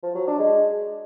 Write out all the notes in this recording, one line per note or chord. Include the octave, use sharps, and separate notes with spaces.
F3
F#3
D4
G#3